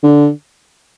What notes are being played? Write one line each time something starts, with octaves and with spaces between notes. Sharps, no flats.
D3